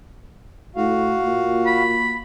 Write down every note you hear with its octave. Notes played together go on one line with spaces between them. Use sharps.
A2 F#4 F5
A#2
B5